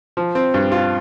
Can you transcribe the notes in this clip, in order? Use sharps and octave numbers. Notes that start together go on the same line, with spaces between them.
F3
C4
G2
F4